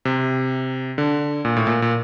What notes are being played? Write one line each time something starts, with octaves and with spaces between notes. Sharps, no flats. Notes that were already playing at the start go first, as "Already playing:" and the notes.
C3
D3
A#2
A2
A#2
A#2